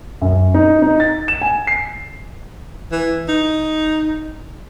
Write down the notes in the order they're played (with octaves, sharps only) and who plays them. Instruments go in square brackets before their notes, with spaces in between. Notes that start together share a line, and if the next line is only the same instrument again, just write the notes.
[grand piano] F#2
D#4
D#4
A6
E7
G#5
C7
[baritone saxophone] E3
D#4